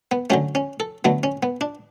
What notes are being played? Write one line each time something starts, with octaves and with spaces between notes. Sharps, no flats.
B3
D3 F#3 A3 C#4
C#4
A4
D3 F#3 A3 B3
C#4
B3
D4